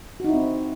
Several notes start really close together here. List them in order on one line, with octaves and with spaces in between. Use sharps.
F#4 D#4 E4 C4